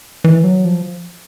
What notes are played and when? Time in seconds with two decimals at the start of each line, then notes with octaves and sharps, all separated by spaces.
0.24 E3
0.44 F#3
0.65 F3